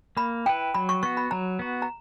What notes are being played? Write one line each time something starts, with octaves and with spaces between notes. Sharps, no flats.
A#3 B5
E4 B4 G5
F#3 B5
C#6
B3 F#4 C#6
B5
F#3 A#5
B3 F#4
A#5